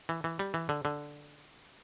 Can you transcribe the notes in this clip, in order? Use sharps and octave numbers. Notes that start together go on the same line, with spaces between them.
E3
E3
G3
E3
D3
D3